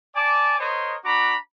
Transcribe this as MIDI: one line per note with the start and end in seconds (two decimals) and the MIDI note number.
0.15 0.57 74
0.15 0.57 80
0.15 0.57 81
0.15 0.57 86
0.59 0.96 70
0.59 0.96 72
0.59 0.96 73
0.59 0.96 75
1.04 1.35 62
1.04 1.35 66
1.04 1.35 82
1.04 1.35 83
1.04 1.35 86